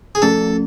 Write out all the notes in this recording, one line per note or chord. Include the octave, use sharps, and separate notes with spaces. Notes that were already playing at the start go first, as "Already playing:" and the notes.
G#4
F3 A3 C#4 A4